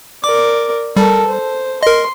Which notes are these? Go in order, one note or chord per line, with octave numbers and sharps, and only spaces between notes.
A#4 D5 D6
G3 A4 A#4
C5
A#4 D#5 C6